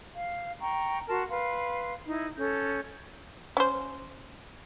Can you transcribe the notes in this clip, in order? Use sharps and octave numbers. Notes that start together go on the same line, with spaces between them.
F5
G5 A#5 C#6
F#4 A#4 A5 C6
B4 F5 C6
D#4 E4
C#4 A4 G6
C#4 C5